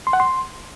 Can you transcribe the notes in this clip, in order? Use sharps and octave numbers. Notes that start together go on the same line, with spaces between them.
C6
F#5
C6